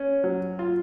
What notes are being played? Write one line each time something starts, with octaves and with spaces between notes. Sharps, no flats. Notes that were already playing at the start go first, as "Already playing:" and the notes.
Already playing: C#4
F#3
F4